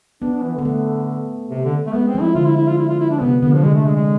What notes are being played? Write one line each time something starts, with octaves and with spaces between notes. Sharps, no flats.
B3 D4
D4
E3
D3 B3
A3
C3
D3
A3
G#3 B3
C4
F3
E4
D3 F4
E4
E4
F4
E4
F4
E4
D4
C3 B3
D3 B3
F3
D3 G#3
A3
G#3
G#3